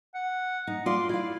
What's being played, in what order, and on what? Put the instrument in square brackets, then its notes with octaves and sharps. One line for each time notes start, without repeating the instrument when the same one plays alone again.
[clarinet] F#5
[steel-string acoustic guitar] D#4
[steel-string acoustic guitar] F4 D5 [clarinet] C6
[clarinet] E4 [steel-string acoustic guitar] D5 F5